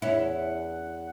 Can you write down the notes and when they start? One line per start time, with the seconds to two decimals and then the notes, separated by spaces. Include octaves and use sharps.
0.02 E2 C#4 E4 F#5